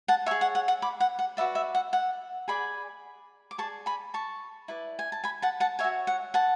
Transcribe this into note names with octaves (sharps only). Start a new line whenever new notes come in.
F#5 A5
G#4 C#5 E5 G#5
F#5
F#5
F#5
B5 D6
F#5
F#5
F#4 B4 D5 E5
E5
F#5
F#5
G#4 D5 G#5 B5
D6
G#4 D5 A5 C#6
G#5 B5
A5 C#6
E4 B4 D5
G#5
A5
G#5 B5
F#5 A5
F#5 A5
C#5 E5 G#5
F#4
F#5
F#5 A5